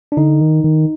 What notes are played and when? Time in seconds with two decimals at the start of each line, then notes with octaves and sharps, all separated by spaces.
0.12 D4
0.17 D3 D#4
0.41 D#3
0.64 D#3